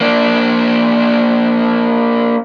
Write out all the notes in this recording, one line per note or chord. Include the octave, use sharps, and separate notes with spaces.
A#3 D4